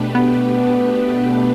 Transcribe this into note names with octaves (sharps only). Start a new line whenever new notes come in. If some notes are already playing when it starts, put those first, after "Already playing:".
Already playing: B2 A3 D4 G4 B4
B3